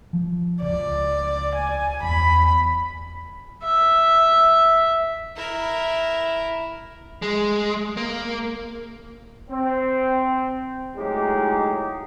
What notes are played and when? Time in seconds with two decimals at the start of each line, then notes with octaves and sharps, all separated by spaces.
0.13 F3
0.62 C#2 D5
1.55 G#5
2.03 E2 B5
3.64 E5
5.36 E4 A#4
7.22 G#3
7.97 A#3
9.50 C4
10.97 A2 F#3 G#3 D#4 G4